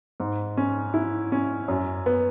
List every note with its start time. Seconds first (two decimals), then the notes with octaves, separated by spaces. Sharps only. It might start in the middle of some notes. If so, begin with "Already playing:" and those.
0.20 G#2
0.57 C#4
0.94 E4
1.32 C#4
1.68 F#2
2.06 B3